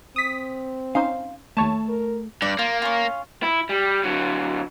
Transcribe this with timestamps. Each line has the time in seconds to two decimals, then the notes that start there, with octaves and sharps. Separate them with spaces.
0.16 C4 D#6 B6
0.95 C#4 D#4 C5 F5
1.57 D#2 A3 C#5 A5
1.89 A#4
2.42 G2 D5
2.59 A#3 F4
2.82 C#4 F4
3.43 E4
3.69 G3
4.03 D3 F#3